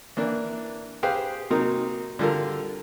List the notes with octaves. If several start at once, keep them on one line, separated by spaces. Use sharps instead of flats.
E3 A#3 D4
G4 G#4 B4 C5 F5 G5
C3 F#3 A#3 C4 D#4 A#4
D3 G3 F4 A4 A#4